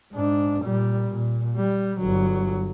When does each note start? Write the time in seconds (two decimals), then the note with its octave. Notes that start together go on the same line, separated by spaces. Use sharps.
0.13 G#2 D4
0.62 A#2 G3
1.10 A#2
1.57 G3
2.00 G1 F#3